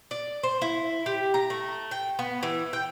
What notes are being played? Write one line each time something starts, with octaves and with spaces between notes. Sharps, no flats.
D5
C5
E4
G4
A#5
A3
G5
B3
E3
G5